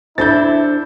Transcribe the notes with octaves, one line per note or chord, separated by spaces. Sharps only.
D4 E4 A4 C5 G6 A6